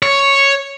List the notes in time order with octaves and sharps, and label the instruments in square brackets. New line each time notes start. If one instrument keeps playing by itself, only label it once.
[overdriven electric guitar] C#5